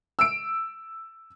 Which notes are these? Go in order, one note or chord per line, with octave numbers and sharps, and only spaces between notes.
E6 D7